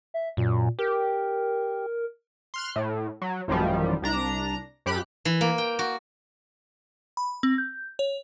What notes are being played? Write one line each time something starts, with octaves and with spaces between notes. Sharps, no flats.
E5
F#2 A#2
G4 A#4
C6 F6 F#6
A2
F#3
A1 F#2 D#3 F3 G3
C2 D4 A#5
F#2 G4 B5 F#6
E3
A#3
G5
F#4
B5
C4
G6
C#5